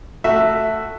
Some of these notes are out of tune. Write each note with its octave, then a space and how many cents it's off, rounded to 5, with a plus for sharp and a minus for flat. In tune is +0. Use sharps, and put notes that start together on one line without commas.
A3 +5 F#4 +0 E5 +0